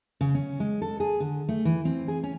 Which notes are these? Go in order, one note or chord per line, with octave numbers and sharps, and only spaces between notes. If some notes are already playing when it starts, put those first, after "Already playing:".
C#3
C#4
G#3
A4
G#4
D3
A3
E3
C4
G#4
C#4